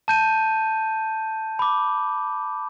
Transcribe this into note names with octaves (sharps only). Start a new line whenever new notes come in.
A5 G6 D#7
B5 D6